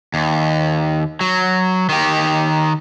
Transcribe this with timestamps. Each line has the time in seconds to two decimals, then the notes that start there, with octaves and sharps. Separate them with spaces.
0.14 D#2
1.21 F#3
1.89 D#3 G4